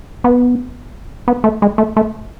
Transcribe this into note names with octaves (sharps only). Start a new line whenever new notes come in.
B3
B3
A3
G#3
A3
A3